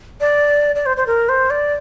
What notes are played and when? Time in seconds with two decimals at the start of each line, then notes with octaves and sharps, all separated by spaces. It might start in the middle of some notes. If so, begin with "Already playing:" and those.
0.21 D5
0.75 D5
0.86 C5
0.97 C5
1.07 A#4
1.29 C5
1.50 D5